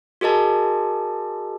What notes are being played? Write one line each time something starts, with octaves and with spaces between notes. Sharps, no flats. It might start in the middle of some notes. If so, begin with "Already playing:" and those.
F#4 G#4 A#4 D#5 A5